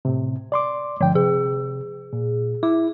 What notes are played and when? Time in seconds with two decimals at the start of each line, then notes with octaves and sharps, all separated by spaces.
0.05 A2 C3
0.52 D5 C6 D6
1.01 G2 D3 F3 G5
1.15 C3 G#4
2.13 A#2
2.63 E4 D6